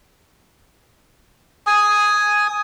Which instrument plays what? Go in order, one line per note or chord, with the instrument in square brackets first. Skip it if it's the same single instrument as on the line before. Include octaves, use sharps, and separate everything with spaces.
[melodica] G#5 D#6